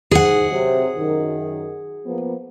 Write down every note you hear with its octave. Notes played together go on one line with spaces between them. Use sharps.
G#2 G#4 F#5
C3 F#3
F#2 D#3
F3 A#3 B3